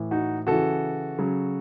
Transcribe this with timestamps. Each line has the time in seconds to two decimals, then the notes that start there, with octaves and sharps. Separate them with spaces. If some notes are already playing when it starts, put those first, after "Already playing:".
Already playing: A2 E3
0.11 D#4 F#4
0.47 C#3 E3 F#4 A4
1.19 C#3 F#3